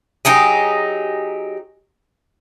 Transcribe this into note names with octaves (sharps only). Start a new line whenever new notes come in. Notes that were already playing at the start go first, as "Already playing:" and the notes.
F#3 D#4 G4 G#4